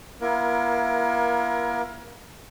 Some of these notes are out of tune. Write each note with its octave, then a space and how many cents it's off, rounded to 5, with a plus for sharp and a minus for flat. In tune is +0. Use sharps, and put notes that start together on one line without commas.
A#3 +40 E4 +40 A#4 +25